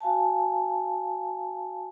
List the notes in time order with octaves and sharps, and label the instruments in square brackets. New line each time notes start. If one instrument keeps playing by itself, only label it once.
[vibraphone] F#4 F5 G#5 A5